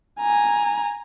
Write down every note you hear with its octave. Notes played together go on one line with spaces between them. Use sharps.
G#5 A#5